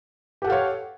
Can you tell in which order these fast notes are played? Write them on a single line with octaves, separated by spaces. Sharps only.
G4 F#5 A4 F5 C#5